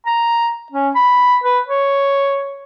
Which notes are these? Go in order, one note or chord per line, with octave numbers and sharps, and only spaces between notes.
A#5
C#4
B5
B4
C#5